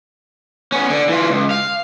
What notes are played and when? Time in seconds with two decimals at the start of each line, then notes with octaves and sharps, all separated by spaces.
0.72 B3 C#4
0.90 D3
1.09 E3 F4
1.30 C#2
1.51 F5